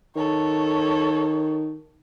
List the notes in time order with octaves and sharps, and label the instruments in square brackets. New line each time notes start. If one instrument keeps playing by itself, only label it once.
[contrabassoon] D#3 [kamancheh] A4 C#5